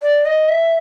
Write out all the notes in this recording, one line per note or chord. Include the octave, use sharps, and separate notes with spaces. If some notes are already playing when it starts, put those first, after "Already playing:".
D5
D#5
E5